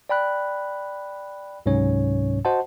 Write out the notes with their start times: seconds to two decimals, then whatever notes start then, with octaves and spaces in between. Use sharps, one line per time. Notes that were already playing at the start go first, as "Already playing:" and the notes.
0.09 D5 G5 B5 F#6
1.66 C#2 G#2 C3 F#3 C#4 C#5
2.45 F#4 C5 D#5 F#5 A5